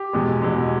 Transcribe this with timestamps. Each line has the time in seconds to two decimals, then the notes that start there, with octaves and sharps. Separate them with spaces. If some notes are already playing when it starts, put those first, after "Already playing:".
Already playing: G4
0.13 E2 B2 G#3
0.42 E2 B2 G#3